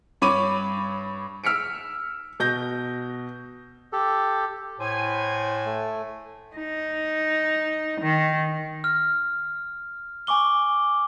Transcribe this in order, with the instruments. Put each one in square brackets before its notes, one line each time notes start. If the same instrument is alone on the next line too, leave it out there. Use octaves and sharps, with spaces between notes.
[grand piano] G2 C#5 B5 D6 D#7
E6 F6 B6 C#7 D7
B2 G6 A#6
[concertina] G4 A4
[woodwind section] A2 G#5 [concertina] C5
[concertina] A3
[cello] D#4
D#3
[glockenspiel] F6
G#5 C#6 D6 G7